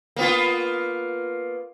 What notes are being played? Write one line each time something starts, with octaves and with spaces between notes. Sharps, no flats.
A#3 B3 F4